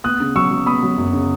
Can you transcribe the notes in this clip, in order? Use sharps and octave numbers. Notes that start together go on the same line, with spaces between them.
B3 D#6 F#6
C#3
F#3 C#6 E6
F#3
B3 B5 D#6
F#3
F#2
C#3